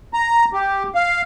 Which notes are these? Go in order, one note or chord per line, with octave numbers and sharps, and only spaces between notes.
A#5
G4
F5